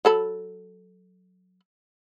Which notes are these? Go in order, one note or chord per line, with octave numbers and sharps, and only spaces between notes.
F#3 A4 B5